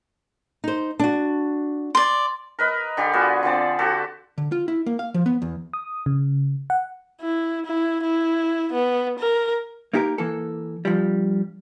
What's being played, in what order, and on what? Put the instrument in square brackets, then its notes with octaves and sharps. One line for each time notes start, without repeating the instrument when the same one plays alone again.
[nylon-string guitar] D#4 C5
D4 F#4
[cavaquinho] D5 C6
[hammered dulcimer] A#4 B4 D#5
D3 G4 D5 G#5
B3 F4 F#4 G#4
D3 F3 C4 D5
F#4 G4 A4
[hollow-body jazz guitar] D3
F4
E4
A#3
F5
F3
B3
E2
[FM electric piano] D#6
C#3
F#5
[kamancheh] E4
E4
E4
B3
A#4
[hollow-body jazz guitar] A#3 D#4 G4 A4 A#4
E3 A#3 A4
G2 F3 G3